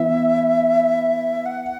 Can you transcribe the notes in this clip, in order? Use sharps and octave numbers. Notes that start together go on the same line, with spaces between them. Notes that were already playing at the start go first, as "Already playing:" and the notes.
Already playing: E3 B3 E5
F#5